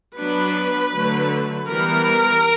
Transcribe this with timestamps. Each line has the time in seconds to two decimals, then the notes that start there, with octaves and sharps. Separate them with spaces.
0.18 F#3 B3 D4 B4
0.93 D3 F#3 A3
1.68 E3 G3 B3 A#4